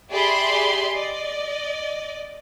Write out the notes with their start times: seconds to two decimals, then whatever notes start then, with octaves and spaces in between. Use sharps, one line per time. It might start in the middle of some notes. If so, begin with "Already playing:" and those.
0.10 G4 G#4 D5 E5 B5 C6
0.93 D5 D#5